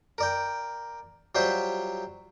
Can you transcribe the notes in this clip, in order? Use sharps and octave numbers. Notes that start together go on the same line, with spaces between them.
A#4 D5 G5
F#3 G3 F4 C5 E5